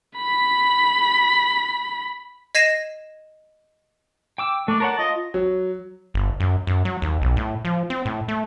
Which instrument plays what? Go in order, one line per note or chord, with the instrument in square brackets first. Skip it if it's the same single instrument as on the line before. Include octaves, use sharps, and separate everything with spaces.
[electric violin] B5 B6
[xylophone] D#5 G#6 A#6 C7 D#7 E7
[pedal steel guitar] G5 D6 E6
[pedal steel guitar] A3 [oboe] D4
[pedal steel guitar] A#4 C#5 F#5 [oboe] A5
[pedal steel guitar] F4 [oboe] D#5
[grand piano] F#3
[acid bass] G1
F#2
F#2
F#3
D#2
B1
A2
F3
C4
A2
A3